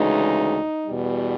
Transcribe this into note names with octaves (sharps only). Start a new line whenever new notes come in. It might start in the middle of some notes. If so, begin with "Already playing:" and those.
Already playing: D2 C#3 E3 G#3 D#4
E2 B2 G3